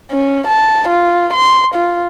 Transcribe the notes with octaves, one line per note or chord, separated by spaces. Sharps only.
C#4
A5
F4
C6
F4